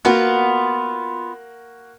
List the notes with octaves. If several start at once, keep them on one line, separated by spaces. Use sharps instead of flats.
A#3 B3 F4 F#4